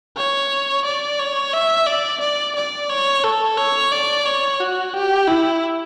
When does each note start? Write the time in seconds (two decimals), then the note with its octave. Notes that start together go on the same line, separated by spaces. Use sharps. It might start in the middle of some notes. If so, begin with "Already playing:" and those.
0.17 C#5
0.85 D5
1.19 C#5
1.53 E5
1.87 D5
2.21 D5
2.56 D5
2.89 C#5
3.24 A4
3.58 C#5
3.92 D5
4.25 C#5
4.61 F#4
4.94 G4
5.28 E4